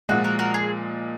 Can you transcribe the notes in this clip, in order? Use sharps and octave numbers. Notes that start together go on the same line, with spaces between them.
A#2 F3 G#3 F#4
F#4 A#4
F#4 A#4
G#4